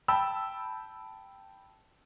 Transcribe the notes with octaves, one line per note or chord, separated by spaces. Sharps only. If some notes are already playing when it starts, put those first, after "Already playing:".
G5 A5 B5 E6